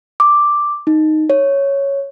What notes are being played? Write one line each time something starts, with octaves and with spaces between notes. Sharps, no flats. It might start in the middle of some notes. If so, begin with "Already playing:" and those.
D6
D#4
C#5